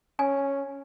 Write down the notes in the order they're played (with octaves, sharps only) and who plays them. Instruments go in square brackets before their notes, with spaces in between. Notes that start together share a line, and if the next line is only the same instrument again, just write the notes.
[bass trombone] C#4 [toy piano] G#5